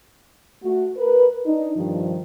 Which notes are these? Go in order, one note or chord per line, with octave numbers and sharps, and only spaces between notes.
A3 F#4
A#4 B4
D4 D#4
G2 D#3 F3